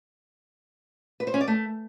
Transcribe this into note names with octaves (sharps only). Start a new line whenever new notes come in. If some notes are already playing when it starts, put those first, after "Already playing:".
B4
C5
C#4
D5
A3